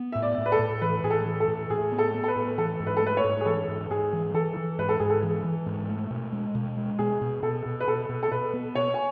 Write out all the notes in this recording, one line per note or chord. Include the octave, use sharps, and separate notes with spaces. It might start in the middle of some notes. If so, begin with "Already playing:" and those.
Already playing: B3
A2 E5
D5
A2
B4
A4
A2
E3 B4
A2 G#4
A4
E3
A4
A2
A2 G#4
B3
A4
B3
A4
B4
A2
E3 A4
G#2
B4
A4
A3 B4
C#5
G#2
G#4
E3 A4
G#2
G#2 G#4
E3
E3 A4
E3
G#2 B4
A4
G#2 G#4
A4
E3
E3
G#2
A3
B2
G#3
B2
G#3
B2 G#4
B2
B2 A4
B2
B4
B2 A4
B2
A4
B2 B4
B3
B2 C#5
G#5